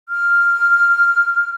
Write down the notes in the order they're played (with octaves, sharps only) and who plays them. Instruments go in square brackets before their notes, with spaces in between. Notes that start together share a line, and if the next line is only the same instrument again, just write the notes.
[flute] F6